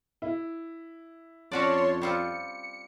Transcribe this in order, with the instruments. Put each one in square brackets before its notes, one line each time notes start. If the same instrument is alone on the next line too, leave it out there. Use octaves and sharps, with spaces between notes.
[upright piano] E4
[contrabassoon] F2 [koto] C#4 F#4 D5 [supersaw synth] C#5 A5 C6
[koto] G3 C4 F4 [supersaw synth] C#7